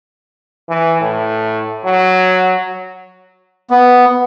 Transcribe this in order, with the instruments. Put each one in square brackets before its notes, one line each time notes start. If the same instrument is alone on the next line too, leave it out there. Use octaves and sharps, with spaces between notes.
[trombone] E3
A2
F#3
[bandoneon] B3